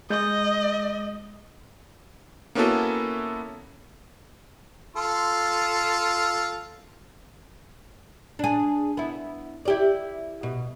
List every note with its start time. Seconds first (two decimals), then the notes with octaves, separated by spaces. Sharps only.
0.10 G#3 D#5 G6
2.55 A#3 B3 C#4 E4 F#4 A4
4.96 F4 A4 C6
8.39 D4 G#4
8.97 B3 E4
9.65 E4 G4 D5
10.43 B2